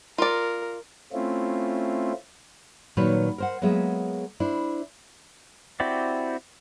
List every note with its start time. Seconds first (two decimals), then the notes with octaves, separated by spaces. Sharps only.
0.18 F4 A#4 D5
1.13 A3 C4 C#4 E4 F4
2.97 A#2 D#3 F#3 B4 C#5
3.38 A#4 C5 F#5
3.62 F#3 G#3 A#3 B3 G#4 E5
4.40 D4 E4 C5
5.80 C4 E4 F#4 G4 D5